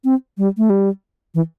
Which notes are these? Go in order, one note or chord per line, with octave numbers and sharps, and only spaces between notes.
C4
G3
A3
G3
E3